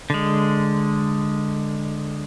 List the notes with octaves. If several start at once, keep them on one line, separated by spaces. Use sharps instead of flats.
D3 G#3